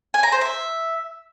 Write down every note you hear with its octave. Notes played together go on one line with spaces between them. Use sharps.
G#5
A#5
C5
E5